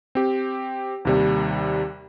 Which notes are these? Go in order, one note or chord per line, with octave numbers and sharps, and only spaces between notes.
C4 G4
D#2 C3 G3